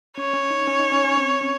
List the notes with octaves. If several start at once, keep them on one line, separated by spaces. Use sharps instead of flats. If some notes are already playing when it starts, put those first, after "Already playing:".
C#4 C#5
C#4
D#4
C#4
D#4
C#4
C#4
C4
C#4